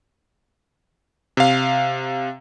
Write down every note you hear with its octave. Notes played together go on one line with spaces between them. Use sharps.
C3 F5